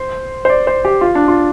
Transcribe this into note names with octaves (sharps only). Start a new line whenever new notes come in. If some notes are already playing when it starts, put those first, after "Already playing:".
Already playing: C5
C5
D5
C5
G4
F4
D4
F4